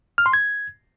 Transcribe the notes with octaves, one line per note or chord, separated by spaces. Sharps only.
F6
C6
G#6